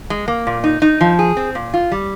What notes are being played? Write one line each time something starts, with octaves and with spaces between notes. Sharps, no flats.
G#3
A#3
A#2
D#4
D#4
F3
G#4
C4
A#2
F4
G3